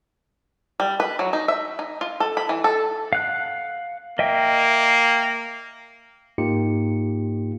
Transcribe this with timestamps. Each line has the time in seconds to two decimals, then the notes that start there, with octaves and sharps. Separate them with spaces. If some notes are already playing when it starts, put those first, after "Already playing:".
0.80 G3
1.00 B4
1.19 F#3
1.33 D#4
1.48 E5
1.79 D#4
2.01 F4
2.20 A4
2.37 B5
2.49 E3
2.64 A4
3.13 F5 F#5 F#6
4.19 A#3 D#5 E5 G5
6.38 G#2 A#3 D#4 F4 G4 C#7